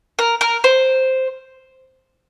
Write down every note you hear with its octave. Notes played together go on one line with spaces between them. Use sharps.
A#4
A#4
C5